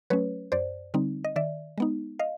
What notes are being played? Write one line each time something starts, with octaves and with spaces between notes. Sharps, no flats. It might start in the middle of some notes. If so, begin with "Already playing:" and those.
F#3 A3 C#4 B4 C#5
F#2 C5 D5
D3 G3 C4 D#4
D#5
D#3 D5 E5
G#3 B3 D#4
D#5 F5